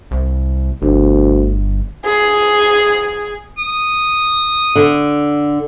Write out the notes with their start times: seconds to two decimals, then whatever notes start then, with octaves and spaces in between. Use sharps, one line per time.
0.11 C2
0.82 G1 D2
2.05 G#4
3.58 D#6
4.76 D3